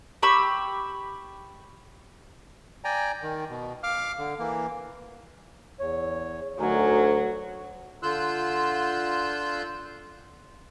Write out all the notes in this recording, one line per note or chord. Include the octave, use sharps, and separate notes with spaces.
G4 B5 C#6 E6
D5 G5 G#5 A#5
D#3
B2
F5 D6 F6
D3
E3 A#3
E2 C#5
D2 F#3 D#4 A#4 G#5
D3 F4 C6 E6 F#6 G6